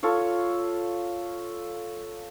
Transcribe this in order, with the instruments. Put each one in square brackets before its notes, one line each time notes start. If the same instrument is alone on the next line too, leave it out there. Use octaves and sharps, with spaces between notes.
[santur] F4 A4 C#5 F5